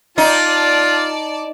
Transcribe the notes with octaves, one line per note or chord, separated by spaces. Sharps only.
D#4 F4 D5 A5